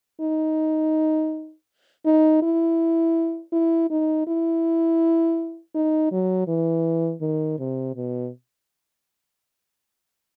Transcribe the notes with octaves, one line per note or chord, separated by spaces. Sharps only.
D#4
D#4
E4
E4
D#4
E4
D#4
F#3
E3
D#3
C3
B2